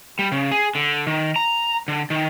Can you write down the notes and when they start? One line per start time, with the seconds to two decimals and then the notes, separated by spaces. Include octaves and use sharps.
0.19 G3
0.32 C#3
0.51 G#4
0.75 D3
1.07 D#3
1.36 A#5
1.88 D3
2.10 D#3